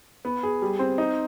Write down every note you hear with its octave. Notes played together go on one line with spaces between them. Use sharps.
B3
G#4
G3
C4
D#4